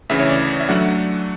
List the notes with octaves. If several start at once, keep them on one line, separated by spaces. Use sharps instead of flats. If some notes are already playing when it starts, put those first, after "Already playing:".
D2 C#3 E3 E5
C#5
D5
E5
F#3 A3 D4 F#5